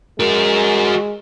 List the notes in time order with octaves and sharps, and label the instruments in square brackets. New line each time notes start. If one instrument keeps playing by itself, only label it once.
[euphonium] G#3 [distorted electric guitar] F#4 A#4